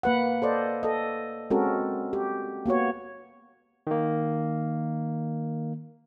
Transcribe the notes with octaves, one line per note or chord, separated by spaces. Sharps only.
A#3 B4 F#5
A4 C5 D5 D#5
A4 D#5
G#3 C4 C#4 F#4 A4 A#4
G4
A#3 B3 F#4 C#5
D#3 A#3